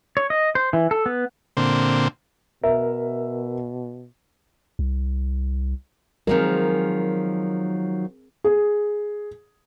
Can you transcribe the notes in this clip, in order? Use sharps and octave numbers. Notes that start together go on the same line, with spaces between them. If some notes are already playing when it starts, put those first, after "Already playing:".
C#5
D#5
C5
E3
A4
B3
A#2 D3 C4
B2 A#4 E5
C2
D#3 F3 F#3 G#3 C4 G#4 A#4
G#4